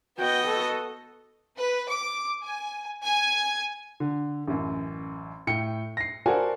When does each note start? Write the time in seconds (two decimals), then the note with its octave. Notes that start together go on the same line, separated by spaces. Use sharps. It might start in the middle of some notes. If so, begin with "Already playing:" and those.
0.19 B3 F#4 D#5 G5
0.47 F#4 A4
1.57 B4
1.89 D6
2.45 G#5
3.03 G#5
4.00 D3
4.47 A1 F#2
5.47 A2 G5 C#7
5.97 A#6 C7
6.26 F#4 A4 A#4 C5 D5 G#5